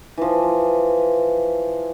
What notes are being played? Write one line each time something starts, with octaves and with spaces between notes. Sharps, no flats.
E3 F3